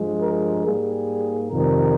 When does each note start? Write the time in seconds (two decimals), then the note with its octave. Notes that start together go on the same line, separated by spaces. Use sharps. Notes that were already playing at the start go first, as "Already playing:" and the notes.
Already playing: G2 F3 G#3
0.21 A#4
0.66 G#2 G3 A#3 G#4
1.51 F2 C3 D#3 G3 A#4